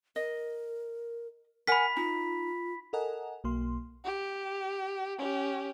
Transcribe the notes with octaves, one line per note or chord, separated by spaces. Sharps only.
A#4 D#5
A#4 F#5 G#5 B5 B6
D#4 F4
A4 A#4 D#5 F#5 G#5
B1 A#3 C6
G4
C#4 G4